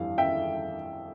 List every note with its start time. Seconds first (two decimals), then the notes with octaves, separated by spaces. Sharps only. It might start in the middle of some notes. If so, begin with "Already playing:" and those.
Already playing: G1 F2 E3 G3 F5
0.18 E5 G5